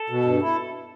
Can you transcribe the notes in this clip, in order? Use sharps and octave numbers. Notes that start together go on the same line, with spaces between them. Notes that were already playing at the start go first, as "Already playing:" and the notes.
Already playing: A4
B2
G2
E4